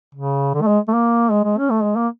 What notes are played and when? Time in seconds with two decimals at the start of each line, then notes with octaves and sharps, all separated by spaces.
0.15 C#3
0.54 D3
0.62 A3
0.67 G#3
0.88 A3
0.93 A#3
1.31 G#3
1.44 G#3
1.58 C#4
1.70 A3
1.83 G#3
1.96 A#3